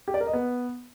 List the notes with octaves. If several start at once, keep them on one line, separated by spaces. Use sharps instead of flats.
G4
D5
A#4
D#5
B3